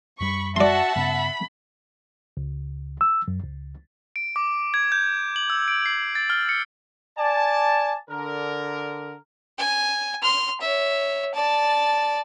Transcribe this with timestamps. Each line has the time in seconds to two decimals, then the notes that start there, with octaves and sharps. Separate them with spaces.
0.21 F#2 G3 B5 C#6
0.56 F#4 D5 E5 F#5 A5 C6
0.96 G2 C#3 B3 B5
2.37 C#2
3.01 E6
3.28 F#2
3.43 C#2
4.16 D7
4.36 D6
4.74 G#6
4.92 G6
5.36 F#7
5.50 E6
5.68 D7
5.86 C7
6.15 A6
6.30 F6
6.49 C#7
7.18 D5 G#5 A5
8.10 D3 A#4
9.59 G#5
10.22 C6 F6
10.61 C#5 E5
11.35 D5 A5